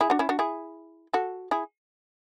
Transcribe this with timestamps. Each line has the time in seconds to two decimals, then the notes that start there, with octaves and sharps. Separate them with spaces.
0.01 E4 G#4
0.10 D4 F#4
0.19 C#4 E4
0.29 D4 F#4
0.39 E4 G#4
1.13 F#4 A4
1.51 E4 G#4